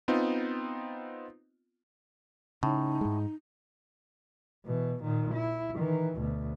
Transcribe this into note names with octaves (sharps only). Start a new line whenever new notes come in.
B3 C4 D#4 F4
A2 C#3 D#4
G#2 G#3
B2 E3
A#2 D#3
E4
D#3 E3
D2 B2